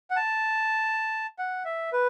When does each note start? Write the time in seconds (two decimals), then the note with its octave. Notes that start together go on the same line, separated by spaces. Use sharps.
0.10 F#5
0.16 A5
1.39 F#5
1.65 E5
1.93 B4